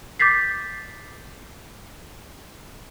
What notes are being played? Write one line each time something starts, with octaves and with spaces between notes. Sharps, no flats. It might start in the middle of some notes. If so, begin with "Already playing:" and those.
D6 G6 A6 B6 C7